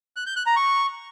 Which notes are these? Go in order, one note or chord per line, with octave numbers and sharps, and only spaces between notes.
F#6
G6
F#6
A#5
C#6